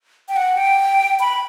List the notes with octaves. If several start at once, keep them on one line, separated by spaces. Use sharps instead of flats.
G5
F#5
G5
B5